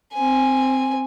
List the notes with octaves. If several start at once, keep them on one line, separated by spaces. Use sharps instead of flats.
C4 G#5